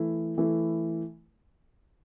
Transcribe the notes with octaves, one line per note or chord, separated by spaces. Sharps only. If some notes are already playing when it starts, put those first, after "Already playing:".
Already playing: E3 A3 E4
E3 A3 E4